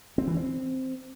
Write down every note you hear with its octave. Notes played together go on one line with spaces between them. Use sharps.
C4
E3
C4